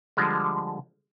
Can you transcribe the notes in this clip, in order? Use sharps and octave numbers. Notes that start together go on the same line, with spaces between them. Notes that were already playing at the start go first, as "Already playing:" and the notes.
D3 F3 G3 G#3